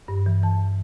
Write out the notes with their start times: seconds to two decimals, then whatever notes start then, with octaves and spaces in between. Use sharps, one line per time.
0.08 G2
0.26 E3
0.43 E3 A5